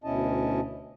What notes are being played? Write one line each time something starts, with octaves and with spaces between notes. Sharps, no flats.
D2 B2 C#4 E4 D#5 A5